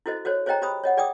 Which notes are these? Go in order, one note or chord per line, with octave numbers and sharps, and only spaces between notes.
E4 F#4 A4 C5 D#5
F#4 A4 C5 C#5
G#4 C5 C#5 D#5 G5 A#5
G4 C5 B5 D#6
C#5 D#5 F#5
G#4 D5 G5 D6 D#6